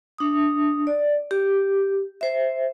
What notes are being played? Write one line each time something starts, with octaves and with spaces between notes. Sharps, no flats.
D4 D#6
D5
G4
C5 E5